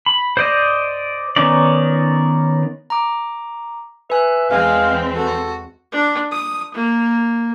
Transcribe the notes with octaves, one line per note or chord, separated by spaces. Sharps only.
B5
C5 D5 D#5
D#3 B3 C#4 D#4 D5
A#5 D6
B4 E5 G#5 F#6
E2 G#3 C4 F5
F#4 A4
D4
D#6
A#3